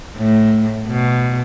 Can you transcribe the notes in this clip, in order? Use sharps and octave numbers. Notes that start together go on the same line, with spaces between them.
A2
B2